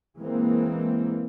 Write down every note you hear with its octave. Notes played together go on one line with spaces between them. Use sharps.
E3 G#3 A#3 C4